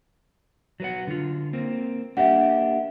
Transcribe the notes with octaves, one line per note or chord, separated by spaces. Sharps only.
F#3 B4 F#5
D3 F4
A#3 C4
A#3 D4 G4 E5 F#5